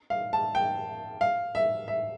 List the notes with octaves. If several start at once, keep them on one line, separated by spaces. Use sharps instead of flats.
F5
A5
G5
F5
E5
E5